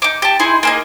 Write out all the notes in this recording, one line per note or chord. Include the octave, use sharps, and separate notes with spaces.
D#4 D6
G4 A5
D#4 E4 G#4 C6
A#3 G#4 D#5